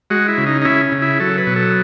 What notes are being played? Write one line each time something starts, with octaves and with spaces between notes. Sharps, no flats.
G#3 F#4
E4
C#3
D#4
D#4
C#4 E4
C#3
E4
F#3 A4
B4
B2
A4